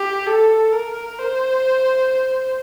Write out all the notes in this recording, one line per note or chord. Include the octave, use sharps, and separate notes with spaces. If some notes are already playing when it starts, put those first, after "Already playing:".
Already playing: G4
A4
A#4
C5